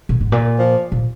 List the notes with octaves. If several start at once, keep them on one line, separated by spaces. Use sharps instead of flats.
A#2
G#2
A#2
F3
A#2